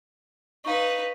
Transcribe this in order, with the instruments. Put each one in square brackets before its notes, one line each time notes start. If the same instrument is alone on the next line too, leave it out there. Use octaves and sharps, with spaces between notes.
[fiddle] D#4 B4 [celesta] F5 C#6